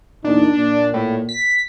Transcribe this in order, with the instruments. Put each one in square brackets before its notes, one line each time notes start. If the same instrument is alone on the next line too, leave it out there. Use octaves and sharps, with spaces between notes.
[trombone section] E2 A#2 D#4 [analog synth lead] D4
[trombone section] A#2
[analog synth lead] A2
B6